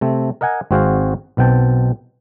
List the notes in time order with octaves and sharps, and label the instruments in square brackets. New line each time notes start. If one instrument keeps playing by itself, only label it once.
[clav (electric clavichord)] C3 A3 C4
A#4 D#5 F#5 G#5
G#1 C4 F#4 G#4 C5 F5
B1 B2 C4 G5 A5